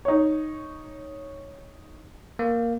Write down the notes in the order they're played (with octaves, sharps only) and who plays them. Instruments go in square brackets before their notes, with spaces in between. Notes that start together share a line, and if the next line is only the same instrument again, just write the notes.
[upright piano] D#4 C#5
[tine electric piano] A#3